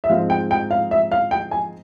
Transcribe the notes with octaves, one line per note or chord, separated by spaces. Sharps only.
E5
G#2 F3 G#3 C4 F5
G5
G5
F5
E5
F5
G5
G#5